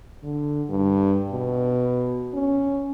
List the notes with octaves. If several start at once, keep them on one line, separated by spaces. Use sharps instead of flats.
D3
G2
B2
C#4